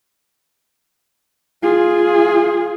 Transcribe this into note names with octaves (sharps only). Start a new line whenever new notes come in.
F4 G#4